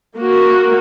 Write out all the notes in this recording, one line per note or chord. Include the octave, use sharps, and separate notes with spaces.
A#3 F#4